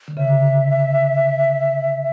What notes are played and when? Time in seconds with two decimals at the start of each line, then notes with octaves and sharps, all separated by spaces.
0.08 D3
0.17 C#3 E5